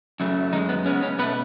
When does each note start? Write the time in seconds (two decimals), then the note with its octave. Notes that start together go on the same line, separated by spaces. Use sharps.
0.20 F#2 C#3 F#3 A3
0.52 F#2 D#3 G#3 D#4
0.69 B3
0.86 C#3 G#3 B3 C#4
1.02 C#4
1.19 B2 B3 B4
1.22 A3